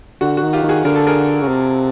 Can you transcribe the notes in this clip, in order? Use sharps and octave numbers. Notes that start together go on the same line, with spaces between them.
D3 F#4
F#4
D#3
F4 G4
D#3
F#4 G#4
D3 A#4
A4
G#4 A#4
C#3
C3